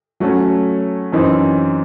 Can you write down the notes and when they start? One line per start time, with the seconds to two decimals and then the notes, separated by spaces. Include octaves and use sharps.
0.20 F#3 A3 C#4
1.12 F#2 E3 C4 D#4